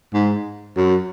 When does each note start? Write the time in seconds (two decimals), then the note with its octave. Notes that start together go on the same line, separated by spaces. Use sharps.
0.14 G#2
0.76 F#2